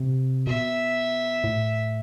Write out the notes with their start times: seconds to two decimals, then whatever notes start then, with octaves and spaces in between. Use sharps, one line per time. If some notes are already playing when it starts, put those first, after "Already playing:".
Already playing: C3
0.46 B2 E5
1.44 A2